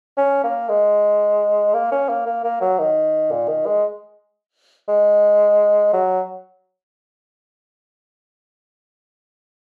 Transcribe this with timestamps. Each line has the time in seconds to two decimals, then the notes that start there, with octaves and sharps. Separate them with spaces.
0.17 C#4
0.44 A#3
0.69 G#3
1.74 A#3
1.92 C#4
2.09 A#3
2.26 A#3
2.44 A#3
2.61 F#3
2.79 D#3
3.31 A#2
3.49 D#3
3.66 G#3
4.88 G#3
5.93 F#3